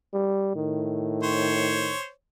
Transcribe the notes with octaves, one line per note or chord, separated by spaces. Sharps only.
G3
A2 D#3
C5 C#5